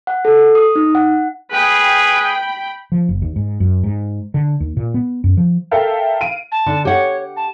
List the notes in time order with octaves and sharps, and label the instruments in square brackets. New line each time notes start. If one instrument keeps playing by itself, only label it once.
[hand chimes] F#5
A4
D#6
D#4
F#5
[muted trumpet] G#4 [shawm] B4 [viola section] G5 B5
[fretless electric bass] F3
F#1
D#2
G#2
F#2
G#2
D3
D#2
A#2
B3
F#2
F3
[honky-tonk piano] A4 A#4 E5 F5 G5 A5
F5 D7 D#7
[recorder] A5
[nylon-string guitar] D3
[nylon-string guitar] G4 F#5 [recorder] C#5
[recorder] A5